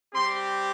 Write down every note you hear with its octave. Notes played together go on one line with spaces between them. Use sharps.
G3 C4 G4 C6